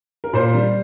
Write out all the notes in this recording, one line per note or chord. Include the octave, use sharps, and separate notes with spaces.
A#4
A#2 C5
G3